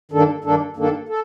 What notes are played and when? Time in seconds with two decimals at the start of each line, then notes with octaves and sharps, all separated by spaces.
0.12 G2 D#3 A#3 D4 A4
0.44 G2 D#3 A#3 D4 A4
0.76 G2 D#3 A#3 D4 A4
1.09 A4